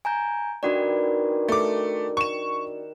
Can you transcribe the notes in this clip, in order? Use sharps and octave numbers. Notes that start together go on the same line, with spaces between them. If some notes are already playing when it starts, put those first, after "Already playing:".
G#5 A#5 G6
D#3 D4 F#4 G4 B4 D5
A3 D6
C#6 E7